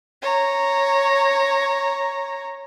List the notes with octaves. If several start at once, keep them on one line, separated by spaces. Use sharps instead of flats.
C#5 A#5